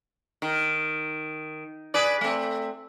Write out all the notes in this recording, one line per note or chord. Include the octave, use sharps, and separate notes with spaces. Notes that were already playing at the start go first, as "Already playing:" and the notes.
D#3
G#4 B4 D5
A3 C4